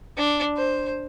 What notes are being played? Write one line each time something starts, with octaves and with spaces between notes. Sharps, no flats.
D4
C5